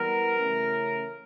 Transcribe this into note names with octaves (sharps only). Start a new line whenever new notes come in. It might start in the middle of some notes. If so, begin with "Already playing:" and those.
Already playing: E3 G3 B3 A#4
C#3 E3 A3 C#4